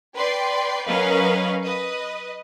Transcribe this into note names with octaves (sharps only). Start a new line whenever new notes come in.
B4 D5 G5 C6
F#3 C#4 A#4 B4 D#5 F5
B4 D#5